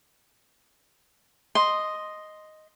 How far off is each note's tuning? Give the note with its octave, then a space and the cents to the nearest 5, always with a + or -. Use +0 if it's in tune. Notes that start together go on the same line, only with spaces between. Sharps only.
D#5 +0 C6 +0